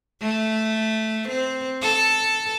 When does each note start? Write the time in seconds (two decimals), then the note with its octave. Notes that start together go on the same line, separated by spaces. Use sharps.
0.21 A3
1.28 C4
1.82 A4